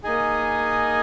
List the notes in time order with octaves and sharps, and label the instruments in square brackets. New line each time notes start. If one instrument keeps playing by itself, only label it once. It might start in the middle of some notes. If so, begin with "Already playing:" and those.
[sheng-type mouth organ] A#3 D#4 G#4 D#5 G#5